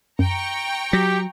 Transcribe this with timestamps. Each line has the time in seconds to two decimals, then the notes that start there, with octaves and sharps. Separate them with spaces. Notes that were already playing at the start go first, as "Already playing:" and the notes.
0.19 F#2 G5 A#5 C#6
0.93 F#3 G4 A#6 B6